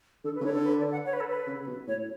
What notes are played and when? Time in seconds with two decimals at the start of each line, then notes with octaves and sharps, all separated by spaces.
0.24 D3 A4
0.35 B4
0.41 C#3
0.45 D3 C#5
0.54 A4
0.65 B4
0.78 D5
0.92 F#5
1.06 C#5
1.13 B4
1.20 A4
1.28 B4
1.47 C#3
1.67 B2
1.87 A2 C#5